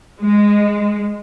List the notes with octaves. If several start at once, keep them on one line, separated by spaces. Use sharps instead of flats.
G#3